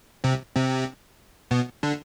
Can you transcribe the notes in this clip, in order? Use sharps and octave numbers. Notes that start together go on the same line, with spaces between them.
C3 C4
C3 C4
B2 B3
D3 D4